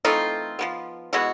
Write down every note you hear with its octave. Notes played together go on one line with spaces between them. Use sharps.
E3 A3 C4 D#4 F4
F3 G#3 B3
B2 G#3 B3 E4 F#4